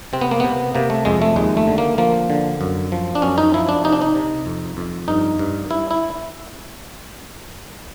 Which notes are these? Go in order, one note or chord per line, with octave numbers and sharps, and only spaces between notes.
C3 C4
B3
A#3
C3 B3
C3 A#3
A3
F2 G#3
A3
D#2 G#3
A3
D3
A#3
F3 A#3
D3
F#2
F3
D4
F#2 C#4
D#4
F3 E4
D4
C3 D#4
D4
D#4
C3
F2
F2
G2 D#4
G2
G2 E4
E4